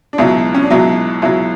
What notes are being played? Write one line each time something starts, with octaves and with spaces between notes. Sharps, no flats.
D4
C#2 B2 F#3 E4
C#4
D4
C#2 B2 F#3 E4
C#2 B2 F#3 E4